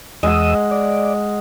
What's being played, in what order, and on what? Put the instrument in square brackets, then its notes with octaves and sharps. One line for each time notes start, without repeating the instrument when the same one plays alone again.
[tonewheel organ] E2 D#6 E6 [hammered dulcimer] G#3 D#5 F#5
[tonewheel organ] D5